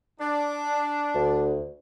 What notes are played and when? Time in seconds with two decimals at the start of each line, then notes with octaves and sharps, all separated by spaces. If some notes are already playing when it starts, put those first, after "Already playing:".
0.19 D4
1.14 D2